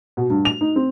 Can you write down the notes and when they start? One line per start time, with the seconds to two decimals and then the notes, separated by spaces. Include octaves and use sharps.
0.17 B2
0.30 G2
0.45 F7
0.61 D#4
0.76 C4